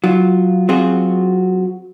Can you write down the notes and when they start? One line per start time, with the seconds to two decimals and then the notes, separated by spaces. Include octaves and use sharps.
0.04 F#3 F4
0.69 F#3 C4 F4 F#4 G#4